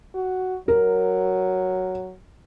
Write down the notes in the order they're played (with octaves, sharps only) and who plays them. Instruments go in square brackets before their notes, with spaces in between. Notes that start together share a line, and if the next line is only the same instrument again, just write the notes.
[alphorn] F#4
[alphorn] F#3 [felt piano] A#4